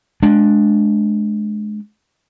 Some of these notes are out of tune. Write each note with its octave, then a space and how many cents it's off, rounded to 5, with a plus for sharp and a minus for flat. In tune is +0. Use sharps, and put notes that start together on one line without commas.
G#3 +25 D4 +0